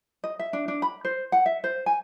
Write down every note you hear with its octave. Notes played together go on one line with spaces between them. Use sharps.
D#5
E5
D4
D4
B5
C5
F#5
E5
C5
G#5